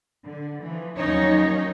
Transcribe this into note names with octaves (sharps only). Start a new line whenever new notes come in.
D3
E3 F3
D#2 F3 F#3 C#4 D#4 C#5